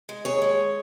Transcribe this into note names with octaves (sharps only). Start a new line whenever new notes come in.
G#3
D#2 G#4 C#5
G#3